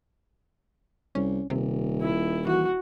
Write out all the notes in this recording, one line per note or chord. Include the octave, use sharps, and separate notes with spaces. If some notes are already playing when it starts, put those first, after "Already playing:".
C2 C#4
D#1 C3
E4
E3 F#4